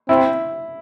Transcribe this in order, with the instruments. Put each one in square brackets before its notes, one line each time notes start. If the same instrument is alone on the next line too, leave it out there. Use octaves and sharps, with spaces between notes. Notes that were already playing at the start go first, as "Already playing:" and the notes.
[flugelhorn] C4 [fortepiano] E4